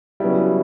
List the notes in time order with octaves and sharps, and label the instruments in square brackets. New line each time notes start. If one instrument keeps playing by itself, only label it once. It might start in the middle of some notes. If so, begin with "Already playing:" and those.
[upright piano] C#3 F#3 B3 E4 [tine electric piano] G3